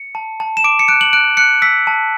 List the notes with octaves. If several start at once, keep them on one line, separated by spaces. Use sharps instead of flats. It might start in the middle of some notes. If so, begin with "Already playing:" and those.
Already playing: C#7
A5
A5
E7
D6 D7
C#7
F#6 D7
F#7
F#6 D7
F#6 C#7
E6 B6
A5